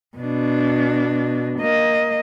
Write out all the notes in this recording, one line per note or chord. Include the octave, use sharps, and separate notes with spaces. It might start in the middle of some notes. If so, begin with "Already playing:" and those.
B2 D4
A#3 D#5